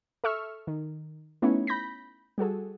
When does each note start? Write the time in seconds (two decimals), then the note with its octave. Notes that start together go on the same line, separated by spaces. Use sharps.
0.24 A4 E5 C#6 E6 F6
0.67 D#3
1.42 A3 B3 C#4 D#4 E4 C#5
1.67 B5 G6 A#6 B6
2.38 G3 F#4 G#4 A4